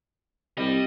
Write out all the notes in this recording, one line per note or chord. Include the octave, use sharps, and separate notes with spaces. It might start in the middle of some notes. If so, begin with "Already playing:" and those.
C2 G3 D#5